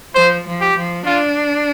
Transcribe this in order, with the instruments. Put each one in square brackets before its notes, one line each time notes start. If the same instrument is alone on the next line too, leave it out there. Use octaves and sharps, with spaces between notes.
[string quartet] F3 [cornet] C5
[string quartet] F3
[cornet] G4
[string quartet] F3
[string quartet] D4 [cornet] F4